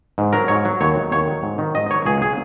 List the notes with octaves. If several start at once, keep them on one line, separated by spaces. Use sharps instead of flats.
G#2
F#3 A#4
G#2 C#5
F#3
D#2 C#5
D#3 F#3
D#2 C#5
D#3 F#3
G#2
D#3 F#3
G#2 D#5
D#3 F#3 C#5
C#2 G#4
C#3 F#3 G#4